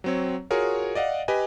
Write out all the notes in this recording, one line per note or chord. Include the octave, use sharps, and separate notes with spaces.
F#3 C4 C#5
F4 F#4 G#4 A#4 C#5
D5 D#5 F5 F#5
G4 B4 D#5 G#5